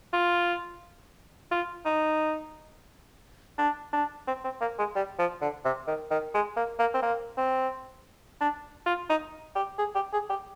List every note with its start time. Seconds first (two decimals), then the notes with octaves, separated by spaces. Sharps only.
0.13 F4
1.51 F4
1.85 D#4
3.58 D4
3.93 D4
4.27 C4
4.44 C4
4.61 A#3
4.79 G#3
4.95 G3
5.19 F3
5.41 D3
5.65 C3
5.87 D#3
6.11 D#3
6.34 G#3
6.56 A#3
6.79 A#3
6.94 C4
7.02 A#3
7.37 C4
8.41 D4
8.86 F4
9.09 D#4
9.55 G4
9.78 G#4
9.95 G4
10.13 G#4
10.30 G4